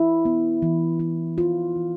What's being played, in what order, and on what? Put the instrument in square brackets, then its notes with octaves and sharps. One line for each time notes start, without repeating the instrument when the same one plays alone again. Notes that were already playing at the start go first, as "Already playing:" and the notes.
Already playing: [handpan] E4
B3
E3
E4
E3 F4
E3